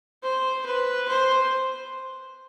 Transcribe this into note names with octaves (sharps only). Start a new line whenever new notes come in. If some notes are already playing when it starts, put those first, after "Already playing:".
C5
B4
C5